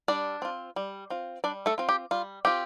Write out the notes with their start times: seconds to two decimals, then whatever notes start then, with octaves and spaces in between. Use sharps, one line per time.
0.08 G3 D4 D5
0.42 C4 F4
0.76 G3
1.10 C4 F4
1.44 G3 D4 D5
1.66 A3 A4
1.78 C4 F4
1.89 G4
2.11 G3 F4
2.45 C4 F4 G4